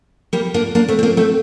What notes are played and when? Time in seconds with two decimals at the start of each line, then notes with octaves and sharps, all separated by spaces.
0.33 G3 A#3
0.54 A#3 D4
0.75 A#3 D4
0.88 A3 C4
0.99 C4
1.03 A#3 D4
1.17 A3 C4